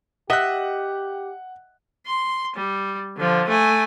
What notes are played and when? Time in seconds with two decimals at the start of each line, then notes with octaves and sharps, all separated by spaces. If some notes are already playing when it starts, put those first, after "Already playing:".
0.30 G4 D#5 E5 F#5 F#6
2.07 C6
2.56 G3
3.17 D3 F3
3.49 A3 G#5